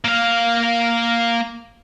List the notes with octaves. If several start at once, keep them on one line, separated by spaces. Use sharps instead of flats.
A#3 F5